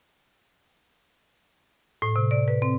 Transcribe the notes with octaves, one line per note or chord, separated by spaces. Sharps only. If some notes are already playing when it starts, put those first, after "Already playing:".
A2
C3
D5
B4
C4